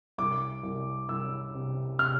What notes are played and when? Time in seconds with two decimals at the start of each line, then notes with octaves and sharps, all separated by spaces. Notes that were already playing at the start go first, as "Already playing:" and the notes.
0.18 C2 D6
0.63 C2
1.09 C2 E6
1.54 C3
1.99 C3 F6